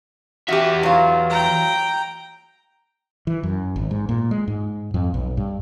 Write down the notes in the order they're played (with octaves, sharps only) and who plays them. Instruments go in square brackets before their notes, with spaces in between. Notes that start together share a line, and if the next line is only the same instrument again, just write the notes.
[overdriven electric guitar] E2 E5 [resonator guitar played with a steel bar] F#4 G4
[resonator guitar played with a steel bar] F#3 F4
[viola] G5 A#5
[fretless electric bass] E3
F#2
G#1
G#2
A#2
G#3
G#2
F2
B1
G2